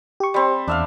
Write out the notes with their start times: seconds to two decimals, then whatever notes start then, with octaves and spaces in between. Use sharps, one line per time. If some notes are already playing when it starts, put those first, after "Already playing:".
0.20 G4 C#6
0.34 G3 C4
0.68 E2 D4 E5 F5